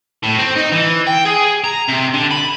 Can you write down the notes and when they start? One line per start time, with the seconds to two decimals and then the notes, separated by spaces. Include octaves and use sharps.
0.23 A2
0.39 C4
0.55 D#4
0.72 E3
1.07 G5
1.25 G#4
1.64 A#5
1.88 C3
2.13 D3
2.31 B5